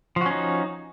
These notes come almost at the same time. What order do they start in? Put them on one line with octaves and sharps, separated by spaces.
F3 F#4 C#4 D#4